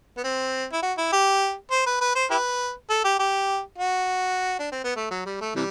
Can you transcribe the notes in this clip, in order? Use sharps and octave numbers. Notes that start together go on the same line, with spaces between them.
B3
C4
E4
F#4
E4
G4
C5
B4
B4
C5
E4 G4 B4
A4
G4
G4
F#4
D4
C4
B3
A3
F#3
G3
A3
C3 E3 G3